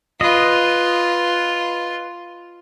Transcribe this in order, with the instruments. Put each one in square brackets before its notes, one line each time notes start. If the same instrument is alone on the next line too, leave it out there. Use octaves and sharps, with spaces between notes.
[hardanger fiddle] F4 [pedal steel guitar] B4 D#5